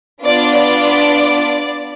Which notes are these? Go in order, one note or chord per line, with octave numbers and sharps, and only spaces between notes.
B3 D4 F4 D5
D5